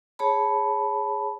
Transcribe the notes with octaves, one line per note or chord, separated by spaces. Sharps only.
G#4 C#5 A5 B5